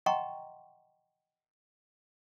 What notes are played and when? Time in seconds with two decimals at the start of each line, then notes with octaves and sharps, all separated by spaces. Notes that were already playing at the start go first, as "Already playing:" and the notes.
0.06 D#5 F#5 G5 A#5 C6 C#6